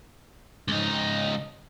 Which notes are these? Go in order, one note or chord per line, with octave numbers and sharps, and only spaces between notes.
C#2 D#4